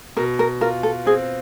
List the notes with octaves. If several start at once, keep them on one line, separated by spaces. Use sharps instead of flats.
B2 A#4
A#4
F4 A#4
A4
C4 G#4